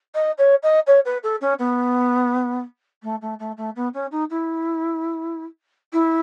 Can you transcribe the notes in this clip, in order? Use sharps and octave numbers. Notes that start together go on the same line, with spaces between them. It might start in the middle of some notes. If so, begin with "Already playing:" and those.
D#5
C#5
D#5
C#5
B4
A4
C#4
B3
A3
A3
A3
A3
B3
C#4
D#4
E4
E4